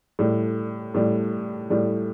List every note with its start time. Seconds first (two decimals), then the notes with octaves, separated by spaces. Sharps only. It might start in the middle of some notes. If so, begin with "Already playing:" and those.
0.19 A2 G3
0.94 A2 G3
1.70 A2 G3